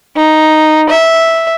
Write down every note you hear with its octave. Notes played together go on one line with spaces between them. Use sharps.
D#4
E5